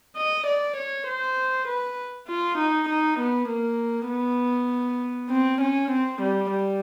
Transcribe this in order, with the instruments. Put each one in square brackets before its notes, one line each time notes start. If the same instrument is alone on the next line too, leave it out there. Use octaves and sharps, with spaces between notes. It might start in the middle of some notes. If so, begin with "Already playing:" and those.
[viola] D#5
D5
C#5
C5
B4
F4
D#4
D#4
B3
A#3
B3
C4
C#4
C4
G3
G3